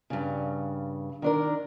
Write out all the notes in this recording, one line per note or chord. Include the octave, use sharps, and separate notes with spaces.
G2 C#3
D#3 D4 A#4